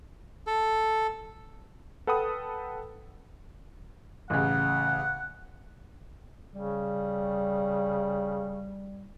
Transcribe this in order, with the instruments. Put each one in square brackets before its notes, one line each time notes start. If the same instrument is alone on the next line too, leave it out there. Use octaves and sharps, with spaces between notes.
[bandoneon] A4
[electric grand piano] A4 B4 F#5 G5 B5 D#6
[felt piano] A1 C#3 [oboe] F#5
[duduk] C#3 [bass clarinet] G3